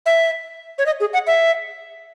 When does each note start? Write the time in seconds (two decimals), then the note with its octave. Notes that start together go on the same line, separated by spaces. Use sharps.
0.06 E5
0.78 C#5
0.86 D#5
1.00 G#4
1.13 F#5
1.27 E5